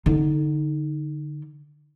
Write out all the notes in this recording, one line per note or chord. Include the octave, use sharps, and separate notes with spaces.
D3 D#4